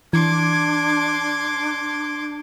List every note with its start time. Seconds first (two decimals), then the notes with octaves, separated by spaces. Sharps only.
0.13 E3 D4 C6 D6 G#6